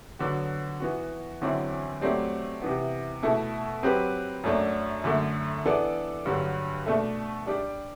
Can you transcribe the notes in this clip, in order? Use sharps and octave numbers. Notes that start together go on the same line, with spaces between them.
D3 F#3 B3 F#4
E3 B3 F#4
E2 D3 F#3 C4 E4
F#3 A3 C4 G4 D5
C3 E3 B3
B2 A3 E4 A4
F#3 C4 G4 B4
F#2 F#3 A3 D4
F#2 D3 A3
E3 B3 D4 A4 D5
G2 D3 F#3
B2 A3 D4 A4 E5
G3 D4 G4 D5